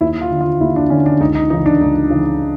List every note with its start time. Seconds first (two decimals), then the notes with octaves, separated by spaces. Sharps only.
0.01 D#2 E4
0.21 F4
0.31 D3
0.41 F4
0.60 D#2 E4
0.76 D4
0.90 D3 C#4
1.06 D4
1.20 C#2 D#4
1.35 D#4
1.50 E3 D#4
1.53 C#3
1.66 D4
1.81 C#2 D#4
2.10 C#3 E3